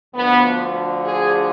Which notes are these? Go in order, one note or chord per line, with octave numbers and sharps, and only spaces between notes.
D2 D3 F3 B3
G#4